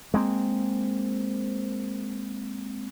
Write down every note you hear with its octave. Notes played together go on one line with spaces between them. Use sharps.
G#3 A#3 C4